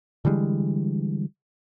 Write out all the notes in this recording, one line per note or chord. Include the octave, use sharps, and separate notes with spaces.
D3 E3 G3 G#3